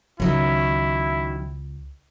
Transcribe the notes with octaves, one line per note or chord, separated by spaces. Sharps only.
C#2 D#3 F#3 C#4 E4